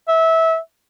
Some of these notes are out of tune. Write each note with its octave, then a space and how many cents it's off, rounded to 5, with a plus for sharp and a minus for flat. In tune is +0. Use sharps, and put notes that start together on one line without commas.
E5 -20